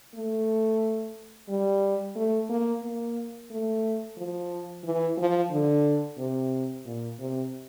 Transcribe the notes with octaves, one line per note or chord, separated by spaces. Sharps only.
A3
G3
A3
A#3
A#3
A3
F3
E3
F3
D3
C3
A#2
C3